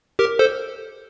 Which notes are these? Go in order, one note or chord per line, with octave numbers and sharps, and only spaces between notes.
G4 A#4
A4 C5